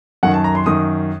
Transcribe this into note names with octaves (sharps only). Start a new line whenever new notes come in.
F#2 D#3 F#5
A5
A#5
C6
F#2 D#3 D#6